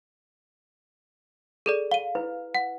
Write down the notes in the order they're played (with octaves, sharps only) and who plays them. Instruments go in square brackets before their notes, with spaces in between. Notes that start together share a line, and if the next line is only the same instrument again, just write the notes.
[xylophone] G#4 A4 D5
[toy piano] F5 [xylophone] D#7 G7
[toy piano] E4 B4
[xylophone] F#5